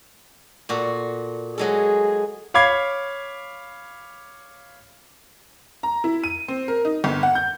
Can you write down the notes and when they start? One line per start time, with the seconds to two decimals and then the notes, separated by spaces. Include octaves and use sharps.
0.69 A#2 F#4 A4
1.58 F#3 G#3 G#4 A4
2.54 C#5 F5 B5 D6 G#6 C7
5.83 A#5
6.04 E4
6.24 D#7
6.48 C4
6.68 A#4
6.85 D#4
7.04 G1
7.23 F#5
7.35 G6